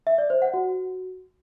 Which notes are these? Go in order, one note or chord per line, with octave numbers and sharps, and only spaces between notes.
E5
D5
C5
F#5
F#4